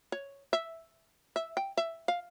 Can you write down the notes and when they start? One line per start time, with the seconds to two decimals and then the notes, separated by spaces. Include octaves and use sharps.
0.12 C#5
0.53 E5
1.36 E5
1.57 G5
1.77 E5
2.08 F5